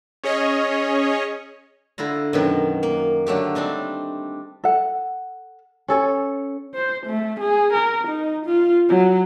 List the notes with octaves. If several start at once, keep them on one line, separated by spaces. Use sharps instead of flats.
C#4 G#4 C#5 D#5
D3 E4 F4 A#5
F#2 B2 D#3
A#3
D3 F#3 A3 G4
G3 C4 D4 D#4
A4 F#5
C#4 A4 C#5
C5
A3
G#4
A#4
D#4
F4
F#3